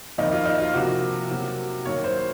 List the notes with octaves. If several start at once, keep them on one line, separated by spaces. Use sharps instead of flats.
F2 D#3 A#3 D#4
F4
D#4
F4
C3 F3 A#3 F#4
C3 F#3 A#3
F#2 D#3 A#3 C#5
C5